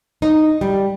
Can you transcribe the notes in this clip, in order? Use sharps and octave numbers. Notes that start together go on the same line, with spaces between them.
D#4
G3